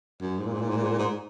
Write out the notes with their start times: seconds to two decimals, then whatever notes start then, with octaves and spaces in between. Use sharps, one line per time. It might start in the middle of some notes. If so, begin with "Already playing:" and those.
0.21 F#2
0.39 G#2
0.47 A#2
0.53 G#2
0.62 A#2
0.70 G#2
0.77 A#2
0.84 G#2
0.92 A#2
0.99 G#2